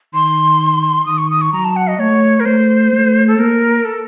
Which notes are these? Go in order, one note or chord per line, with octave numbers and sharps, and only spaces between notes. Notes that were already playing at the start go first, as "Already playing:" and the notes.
D#3 C6
D#3 D#6
C#6
D#6
C#6
F#3 A#5
A5
F#5
D#5
A3 C#5
A#4
A3 C5
A3
A4
A#3 A#4
A4